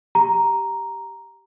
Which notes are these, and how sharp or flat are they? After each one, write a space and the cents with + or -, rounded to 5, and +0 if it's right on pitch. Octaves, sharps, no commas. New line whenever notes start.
G4 +0 A#5 +0